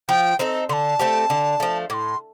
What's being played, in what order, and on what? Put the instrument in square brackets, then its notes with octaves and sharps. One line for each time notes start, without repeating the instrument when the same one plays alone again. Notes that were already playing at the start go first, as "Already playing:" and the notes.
[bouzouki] F3 [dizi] G5
[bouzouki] C4 D#4 A4
[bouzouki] D3 [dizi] A5 C6
[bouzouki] A3 C4 G4
D3
F3 A3
[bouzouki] A2 [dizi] D6
[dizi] C6